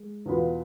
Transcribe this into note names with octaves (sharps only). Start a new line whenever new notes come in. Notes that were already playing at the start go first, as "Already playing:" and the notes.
Already playing: G#3
E2 B2 B3 F4 B4